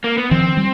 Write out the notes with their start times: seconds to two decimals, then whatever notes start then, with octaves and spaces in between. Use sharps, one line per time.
0.04 A#3
0.18 B3
0.31 D#3 F3 C4
0.57 G3